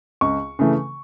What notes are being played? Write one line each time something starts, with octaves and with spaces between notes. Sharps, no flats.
C#2 C#6
C#3 E3 A3